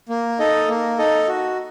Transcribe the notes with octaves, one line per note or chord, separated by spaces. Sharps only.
A#3
D#4 A4 D#5
A#3
D#4 A4 D#5
F#4